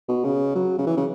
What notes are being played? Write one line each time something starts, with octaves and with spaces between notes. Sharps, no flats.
B2
C#3
F#3
C#3
E3
C#3